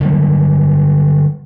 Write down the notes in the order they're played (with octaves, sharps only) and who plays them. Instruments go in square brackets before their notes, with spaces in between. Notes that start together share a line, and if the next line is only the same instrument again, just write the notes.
[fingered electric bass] D3 F#3 G3